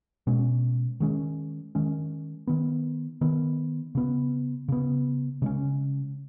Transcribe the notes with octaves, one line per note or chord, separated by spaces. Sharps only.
B2 G#3 C#4
D#3 G#3 C#4
D#3 G#3 C#4
D#3 B3
D#3 B3
C#3 B3
C#3 B3
C#3 G#3 C#4